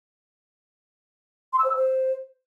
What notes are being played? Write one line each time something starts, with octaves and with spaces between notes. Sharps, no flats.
C6
E6
C5
E6
C5